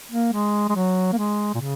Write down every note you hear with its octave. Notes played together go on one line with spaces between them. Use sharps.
A#3
G#3
G#3
F#3
A#3
G#3
A#2
C#3